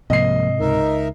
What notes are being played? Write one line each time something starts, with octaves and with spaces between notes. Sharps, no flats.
C2 G#2 C3 F3 A#3 D#5 C7
C#2 D#4 A#4 E5